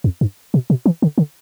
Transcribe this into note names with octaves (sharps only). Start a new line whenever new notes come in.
F2
G2
B2
B2
E3
D3
D3